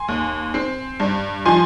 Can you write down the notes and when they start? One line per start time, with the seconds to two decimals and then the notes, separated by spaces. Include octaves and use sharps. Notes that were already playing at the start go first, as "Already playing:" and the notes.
Already playing: G#5 C6
0.08 D#2
0.54 C4
1.00 G2
1.45 F3 G#5 C6